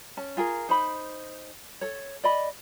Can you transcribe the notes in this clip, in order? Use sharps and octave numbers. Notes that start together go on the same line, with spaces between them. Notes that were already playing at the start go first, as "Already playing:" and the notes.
C#4 A5
F4 G#4 A#4
D#4 C5 B5
A4 C#5
D5 D#5 B5